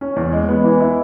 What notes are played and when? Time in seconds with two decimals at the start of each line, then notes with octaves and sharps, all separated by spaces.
0.01 C#4
0.16 E2
0.32 G#3
0.49 B3
0.64 E3
0.80 E4